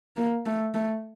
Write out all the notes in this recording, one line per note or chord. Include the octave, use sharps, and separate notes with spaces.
A#3
A3
A3